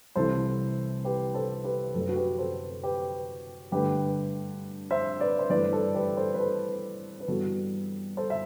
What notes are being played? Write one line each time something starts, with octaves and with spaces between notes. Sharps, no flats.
C2 C3 E3 A4 C5
G4 B4
A4 C5
G4 B4
F#2 F#3 A3 A4
B4
F#4 A4
G4 B4
A4 C5
G4 B4
G2 D3 A3 G4 B4
C5 E5
B4 D5
C5
G2 E3 A3 B4 D5
A4 C5
G4 B4
A4 C5
B4
A4 C5
B4
G2 E3 G3 B3 F#4 A4
A4 C5
E5